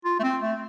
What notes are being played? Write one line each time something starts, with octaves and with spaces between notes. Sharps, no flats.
F4
A3
C4
A3